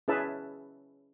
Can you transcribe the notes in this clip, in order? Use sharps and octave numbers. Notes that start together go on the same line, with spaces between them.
C#4 E4 G#4 B4 E5 A5